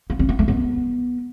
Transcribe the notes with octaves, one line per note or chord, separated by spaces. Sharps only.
B3
C4
B3
A3
B3